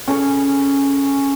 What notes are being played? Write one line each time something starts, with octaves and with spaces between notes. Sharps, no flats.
C#4 G#4 A4